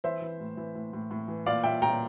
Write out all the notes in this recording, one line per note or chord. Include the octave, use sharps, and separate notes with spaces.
E3 C5 E5
E3
A2
E3
A2
A2
A2
E3
A#2 D5 F5
A#2 E5 G5
A#2 G5 A#5